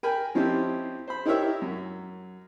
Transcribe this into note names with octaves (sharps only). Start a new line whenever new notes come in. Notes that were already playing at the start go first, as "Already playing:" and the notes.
A#4 G5 G#5 B5
F3 C4 C#4 D#4 E4 G4
C5 B5
D#4 E4 G4 A#4 C#5 E5
F#2